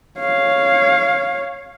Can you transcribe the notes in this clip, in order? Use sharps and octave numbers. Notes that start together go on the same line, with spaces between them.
C#5 F5